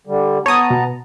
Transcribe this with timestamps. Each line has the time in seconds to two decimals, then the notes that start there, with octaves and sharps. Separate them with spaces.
0.07 D3 G3
0.46 B3 C#5 A5 A#5 D#6
0.70 B2